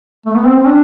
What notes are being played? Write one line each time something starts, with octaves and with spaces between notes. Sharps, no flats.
A3
B3
C4
C4
D4